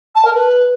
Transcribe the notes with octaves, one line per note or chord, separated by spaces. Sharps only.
A5
A#4
B4